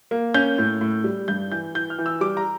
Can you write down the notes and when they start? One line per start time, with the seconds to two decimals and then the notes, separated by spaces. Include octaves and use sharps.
0.11 A#3
0.34 C#4 G6
0.58 A2
0.81 A2
1.04 G3
1.28 G2 G6
1.51 E3 G6
1.75 E3 G6
1.90 F6
1.98 E3
2.06 E6
2.21 G3 D6
2.37 A#5